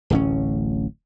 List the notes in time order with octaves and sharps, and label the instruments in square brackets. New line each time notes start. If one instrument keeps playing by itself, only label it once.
[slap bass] D1 A1 C#4